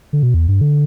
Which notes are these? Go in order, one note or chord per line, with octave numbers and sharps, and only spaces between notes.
D3
B2
E2
G2
D3